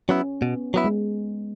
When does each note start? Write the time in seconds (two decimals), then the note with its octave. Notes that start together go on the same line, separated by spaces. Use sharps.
0.09 F#3 B3 C#4 E4
0.41 B2 B3
0.74 F#3 B3 E4
0.84 G#3